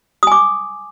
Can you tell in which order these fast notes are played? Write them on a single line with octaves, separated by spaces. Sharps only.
D#6 G#5 D6